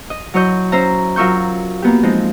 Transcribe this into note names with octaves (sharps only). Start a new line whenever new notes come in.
D#5
F#3 E4 C#5 D#5 G6
C#4 C5 E5 A#5
F#3 F4 A#4 E5 C#6 G6
A#3 B3 G4
F3 G#3 C4 D#4